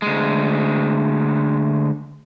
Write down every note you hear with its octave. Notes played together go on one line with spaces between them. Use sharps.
D2 G#3